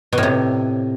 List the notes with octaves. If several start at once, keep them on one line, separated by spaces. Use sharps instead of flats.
B2
A2
C3